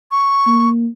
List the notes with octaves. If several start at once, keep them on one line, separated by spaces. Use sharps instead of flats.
C#6
A#3